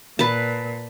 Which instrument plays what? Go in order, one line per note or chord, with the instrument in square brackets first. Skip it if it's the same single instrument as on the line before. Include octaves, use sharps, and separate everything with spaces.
[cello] A#2 [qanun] B4 A5